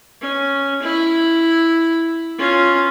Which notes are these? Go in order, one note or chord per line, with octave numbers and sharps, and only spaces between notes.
C#4
E4
C#4 F4